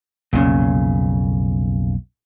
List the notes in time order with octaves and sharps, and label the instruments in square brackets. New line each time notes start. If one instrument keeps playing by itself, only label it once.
[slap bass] B1 F2 [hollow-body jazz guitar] A#2 C#3